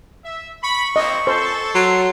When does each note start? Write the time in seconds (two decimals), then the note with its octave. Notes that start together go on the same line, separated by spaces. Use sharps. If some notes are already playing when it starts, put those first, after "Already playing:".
0.24 E5
0.63 B5 C#6
0.96 F3 A#3 C4 D#5
1.27 A4 C5
1.75 F#3 C6